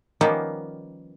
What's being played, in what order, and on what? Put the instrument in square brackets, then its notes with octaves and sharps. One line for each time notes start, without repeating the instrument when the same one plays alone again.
[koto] D#3 F3 G3 A#3 B3 C#4